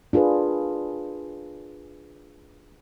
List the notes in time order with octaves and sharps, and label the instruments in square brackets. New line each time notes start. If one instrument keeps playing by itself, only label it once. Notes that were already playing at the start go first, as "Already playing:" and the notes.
[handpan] D4 F4 G#4 A#4 B4